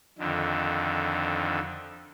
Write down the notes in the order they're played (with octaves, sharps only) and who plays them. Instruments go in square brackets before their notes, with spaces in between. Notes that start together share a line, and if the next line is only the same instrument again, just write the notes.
[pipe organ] F2 D3 D#3